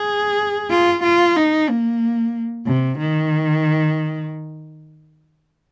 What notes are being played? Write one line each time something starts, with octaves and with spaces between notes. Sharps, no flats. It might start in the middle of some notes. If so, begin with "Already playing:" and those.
Already playing: G#4
F4
F4
D#4
A#3
C3
D#3